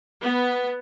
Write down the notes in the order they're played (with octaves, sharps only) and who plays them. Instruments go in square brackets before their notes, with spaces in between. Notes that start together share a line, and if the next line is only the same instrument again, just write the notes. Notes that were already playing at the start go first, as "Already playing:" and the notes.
[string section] B3